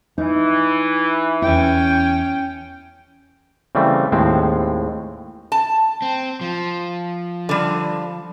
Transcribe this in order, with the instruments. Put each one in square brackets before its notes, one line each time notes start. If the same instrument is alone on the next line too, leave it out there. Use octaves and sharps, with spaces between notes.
[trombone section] E3 [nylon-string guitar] D#4
[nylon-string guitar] E2 G2 E4 [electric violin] C#4 G5
[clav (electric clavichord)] C#3 E3 G3 A3 C4
D#2 A2 G#3 C4
[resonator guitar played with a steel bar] A5
[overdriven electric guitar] C4
F3
[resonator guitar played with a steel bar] D3 G3